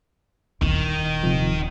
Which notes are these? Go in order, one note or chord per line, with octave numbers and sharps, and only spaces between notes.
D#1 D#3 E4
C3 F3